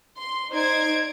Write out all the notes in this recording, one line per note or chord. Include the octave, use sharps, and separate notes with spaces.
C6
D#4 C5 D5 G#6 D7